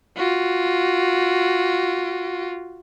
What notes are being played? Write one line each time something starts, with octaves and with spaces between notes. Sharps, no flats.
F4 F#4